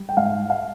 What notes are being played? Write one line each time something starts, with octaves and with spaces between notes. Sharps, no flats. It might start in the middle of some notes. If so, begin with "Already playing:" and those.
Already playing: G3
G5
G#2 F5
F5